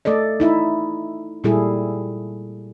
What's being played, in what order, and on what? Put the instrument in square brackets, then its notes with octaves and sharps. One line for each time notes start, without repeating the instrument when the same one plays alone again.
[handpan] A3 A4 D5 D#5
D#4 E4 E5
A#2 G3 E4 G#4 A4